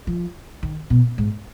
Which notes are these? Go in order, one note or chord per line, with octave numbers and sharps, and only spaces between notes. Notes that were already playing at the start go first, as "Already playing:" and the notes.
F3
D#3
B2
G#2